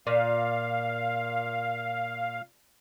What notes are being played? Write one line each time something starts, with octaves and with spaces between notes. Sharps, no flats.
A#2 F5